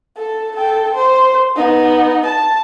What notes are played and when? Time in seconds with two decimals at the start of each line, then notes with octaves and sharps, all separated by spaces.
0.17 A4
0.57 A4 G5
0.94 C5
1.55 B3 D#4
2.26 A5